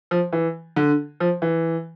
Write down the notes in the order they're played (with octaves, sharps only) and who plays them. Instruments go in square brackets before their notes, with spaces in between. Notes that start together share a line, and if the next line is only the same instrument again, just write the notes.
[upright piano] F3
E3
D3
F3
E3